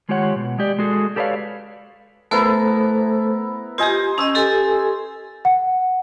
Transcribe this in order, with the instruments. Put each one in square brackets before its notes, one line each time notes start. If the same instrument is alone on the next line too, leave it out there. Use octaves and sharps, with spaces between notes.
[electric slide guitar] D#3 G#3 F4 G4 C#5 F#5
B2
G#3 G4 D5
G#3 F#4 G#4 A4
G4 A4 B4 C#5 D5 F5
[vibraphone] A3 A4 C5 [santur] B3 E4 A#4
[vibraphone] F4 G4 [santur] C5 D#5 G#5
[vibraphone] C#4 D#5 [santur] C6 D#6 E6
[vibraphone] G4 A4 G#5
[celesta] F#5